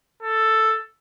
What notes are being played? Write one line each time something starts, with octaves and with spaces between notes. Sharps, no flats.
A4